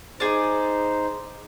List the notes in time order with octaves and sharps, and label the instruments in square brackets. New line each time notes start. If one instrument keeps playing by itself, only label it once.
[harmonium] D#4 C5 [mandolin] G#4 D5